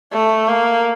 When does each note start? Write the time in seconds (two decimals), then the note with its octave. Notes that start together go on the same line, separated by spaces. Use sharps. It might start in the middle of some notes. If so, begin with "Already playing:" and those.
0.13 A3
0.49 A#3